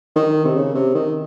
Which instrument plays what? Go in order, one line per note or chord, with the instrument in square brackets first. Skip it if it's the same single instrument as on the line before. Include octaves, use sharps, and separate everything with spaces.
[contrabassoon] D#3
C3
C#3
C3
D#3